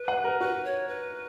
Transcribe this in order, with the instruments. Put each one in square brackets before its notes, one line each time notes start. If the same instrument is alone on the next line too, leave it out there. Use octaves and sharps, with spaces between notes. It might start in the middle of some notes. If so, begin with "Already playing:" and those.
Already playing: [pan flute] B4
[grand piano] F#5
A#4
[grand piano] F#4 [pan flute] B4
[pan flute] C#5
B4